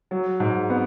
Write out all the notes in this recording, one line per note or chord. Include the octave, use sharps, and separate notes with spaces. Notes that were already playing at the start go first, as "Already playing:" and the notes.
F#3
G#2
B3